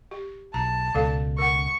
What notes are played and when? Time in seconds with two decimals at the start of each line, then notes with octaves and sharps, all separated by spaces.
0.11 G4
0.54 B1 A5 A#5
0.94 C#2 B2 G#3 A4 F5
1.38 A#4 F#5 C#6